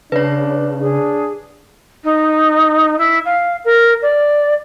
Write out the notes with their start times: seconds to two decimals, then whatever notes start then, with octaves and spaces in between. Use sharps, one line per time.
0.12 C#3 D4 B4 C#5
0.79 D4 G#4
2.04 D#4
2.98 E4
3.25 F5
3.64 A#4
4.02 D5